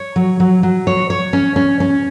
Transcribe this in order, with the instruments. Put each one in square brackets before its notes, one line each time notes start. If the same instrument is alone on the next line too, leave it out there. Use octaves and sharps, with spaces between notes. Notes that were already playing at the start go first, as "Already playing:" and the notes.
Already playing: [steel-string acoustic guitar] C#5
F#3
F#3
F#3
C#5
C#5
C#4
C#4
C#4